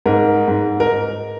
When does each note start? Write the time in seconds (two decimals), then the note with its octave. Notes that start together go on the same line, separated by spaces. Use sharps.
0.06 G#2 A#4
0.48 G#2
0.80 A#4